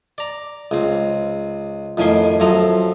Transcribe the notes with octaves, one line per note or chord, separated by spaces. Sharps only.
D5 A#5
C#2 C4
F2 A2 D#3 C#4 G#5 C6
F#2 F3 C4 A4 A#5 D#6